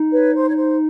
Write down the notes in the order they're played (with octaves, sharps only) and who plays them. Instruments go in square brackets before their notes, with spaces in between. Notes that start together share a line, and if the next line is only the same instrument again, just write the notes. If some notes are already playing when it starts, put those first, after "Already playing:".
Already playing: [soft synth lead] D#4
[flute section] B4 C#5
C5
C#5
C5